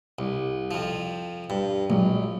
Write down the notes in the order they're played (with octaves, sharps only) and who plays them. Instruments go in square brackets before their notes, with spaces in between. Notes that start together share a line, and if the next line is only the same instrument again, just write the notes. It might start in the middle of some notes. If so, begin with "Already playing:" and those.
[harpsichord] C2
F2 F3
G2
[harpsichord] A#1 [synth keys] F#3 G#3 A#3